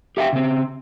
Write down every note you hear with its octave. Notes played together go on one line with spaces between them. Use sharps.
G4 E5 F5 G5
C#3 C4